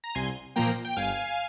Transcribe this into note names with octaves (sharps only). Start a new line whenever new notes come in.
A#5
C2 G#5 C6
A#2 F3 A#3 G5 A#5
G5
G1 F5 G#5